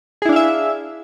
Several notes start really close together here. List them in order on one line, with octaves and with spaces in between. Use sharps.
G#4 E4 D4 F5 E5